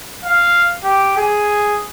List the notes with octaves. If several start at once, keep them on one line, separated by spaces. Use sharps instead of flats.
F5
G4
G#4